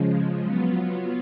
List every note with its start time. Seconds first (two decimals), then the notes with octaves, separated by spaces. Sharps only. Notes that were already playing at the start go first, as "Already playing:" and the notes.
Already playing: C#3 F3 G#3
0.44 F#3 B3 F4